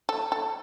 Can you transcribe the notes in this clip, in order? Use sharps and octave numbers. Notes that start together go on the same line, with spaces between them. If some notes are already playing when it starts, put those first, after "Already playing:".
A4
A4